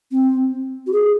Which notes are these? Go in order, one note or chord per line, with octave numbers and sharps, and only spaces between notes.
C4
F#4
G#4